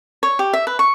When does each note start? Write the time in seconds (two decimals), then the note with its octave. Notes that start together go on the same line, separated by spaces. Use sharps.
0.23 C#5
0.39 G4
0.53 E5
0.67 B4
0.79 C#6